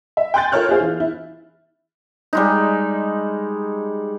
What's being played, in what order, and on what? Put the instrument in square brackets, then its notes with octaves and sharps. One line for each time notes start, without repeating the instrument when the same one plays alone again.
[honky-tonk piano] E5
G5 G#5 C6 F#6 G6 A6
F4 A4 A#4 C#5 F6 F#6
F4 G4 G#4 C5 F5
E3
E4
[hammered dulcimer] G3 G#3 D#4